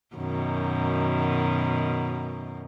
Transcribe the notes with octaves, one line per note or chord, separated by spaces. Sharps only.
F#2 B2 D#3